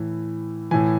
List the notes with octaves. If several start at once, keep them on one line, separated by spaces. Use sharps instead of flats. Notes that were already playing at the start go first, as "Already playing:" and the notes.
Already playing: A2 E3
A2 E3 G#5